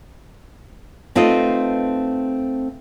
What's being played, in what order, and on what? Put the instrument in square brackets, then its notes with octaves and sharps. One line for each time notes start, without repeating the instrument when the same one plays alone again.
[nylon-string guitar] A3 C4 D#4 F4 B4 D#5